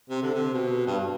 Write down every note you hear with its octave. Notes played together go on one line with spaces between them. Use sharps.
C3
D3
C3
B2
G2